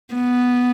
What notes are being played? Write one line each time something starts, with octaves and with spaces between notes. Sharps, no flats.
B3